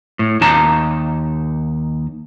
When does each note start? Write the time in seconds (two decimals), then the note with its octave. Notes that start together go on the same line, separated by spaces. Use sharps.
0.19 A2
0.41 D#2 D#4 A5 A#5